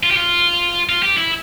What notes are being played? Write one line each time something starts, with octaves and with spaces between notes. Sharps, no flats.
F4
G4
F4
F4
G4
E4